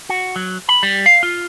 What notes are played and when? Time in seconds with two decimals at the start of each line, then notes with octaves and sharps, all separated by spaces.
0.09 F#4
0.36 F#3
0.69 B5
0.83 G3
1.06 F5
1.23 F4